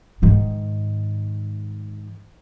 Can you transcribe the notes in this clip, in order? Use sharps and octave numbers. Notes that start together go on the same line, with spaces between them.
G#2 D#3